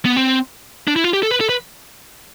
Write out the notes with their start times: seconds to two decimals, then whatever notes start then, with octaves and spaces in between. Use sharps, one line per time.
0.05 B3
0.17 C4
0.88 D4
0.96 E4
1.04 F4
1.13 G4
1.23 A4
1.31 B4
1.41 A4
1.49 B4